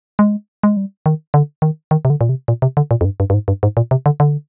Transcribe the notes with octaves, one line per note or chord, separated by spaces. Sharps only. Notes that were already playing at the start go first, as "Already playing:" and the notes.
G#3
G#3
G3
D#3
D3
D#3
D#3
C3
D3
A#2
C3
A#2
C3
D3
A#2
F2
G2
G2
G2
G#2
G2
G#2
A#2
C3
D3
D3